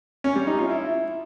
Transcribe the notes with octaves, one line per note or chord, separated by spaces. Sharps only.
C#4
G3
D#4
F4
E4